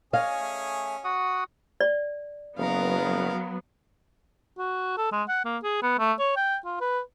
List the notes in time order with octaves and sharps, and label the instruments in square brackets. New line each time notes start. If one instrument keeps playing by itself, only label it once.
[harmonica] C#4 G#4 [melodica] C#5 G#5 [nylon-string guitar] D#5 F5
[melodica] A3
F#4 F#5 D#6
[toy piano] D5
[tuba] F#1 [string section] F#3 B3 [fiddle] A#4 F5
[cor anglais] F#4
A4
G#3
F#5
A#3
G#4
B3
A3
C#5
G5
F4
B4